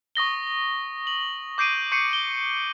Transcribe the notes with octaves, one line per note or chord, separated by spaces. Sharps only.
C#6 D#6 A#6 G7
F#7
D6 G6 C7 D7 D#7
C#6 G6 C7 C#7 D#7
G7